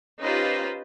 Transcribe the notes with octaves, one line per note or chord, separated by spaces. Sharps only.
C#4 D#4 F4 G4 B4 C5